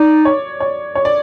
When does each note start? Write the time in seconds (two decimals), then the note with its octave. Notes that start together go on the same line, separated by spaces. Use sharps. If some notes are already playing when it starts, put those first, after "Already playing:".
Already playing: D#4 D5
0.25 C#5
0.60 C#5
0.95 C#5
1.05 D5